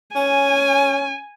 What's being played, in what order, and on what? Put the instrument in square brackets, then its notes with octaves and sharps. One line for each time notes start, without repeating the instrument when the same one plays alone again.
[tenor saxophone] C#4 [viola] G#5